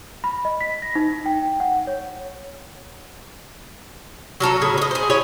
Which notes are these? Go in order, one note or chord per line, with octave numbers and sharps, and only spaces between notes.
B5
D#5
B6
A#6
D#4
G5
F#5
C#5
F#3 F4 A4 A#5
A2 C#3 G#4
C#5 D#5
G#4 C5
C#4 E4 G#4 C#5